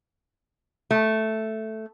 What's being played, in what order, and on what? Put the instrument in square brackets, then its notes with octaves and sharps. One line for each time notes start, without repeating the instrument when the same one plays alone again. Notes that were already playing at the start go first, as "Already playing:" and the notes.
[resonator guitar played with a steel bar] A3